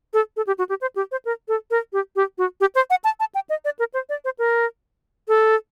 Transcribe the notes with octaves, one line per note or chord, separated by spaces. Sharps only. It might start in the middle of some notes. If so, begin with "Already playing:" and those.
A4
A4
G4
F#4
G4
C5
G4
C5
A#4
A4
A#4
G4
G4
F#4
G4
C5
F#5
A5
A5
G5
D#5
D5
A#4
C5
D5
C5
A#4
A4